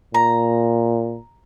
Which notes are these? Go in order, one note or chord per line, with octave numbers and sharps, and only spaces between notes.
A#2 A#5